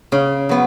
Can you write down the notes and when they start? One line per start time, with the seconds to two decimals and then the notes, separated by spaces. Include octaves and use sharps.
0.12 C#3
0.49 F#3 B3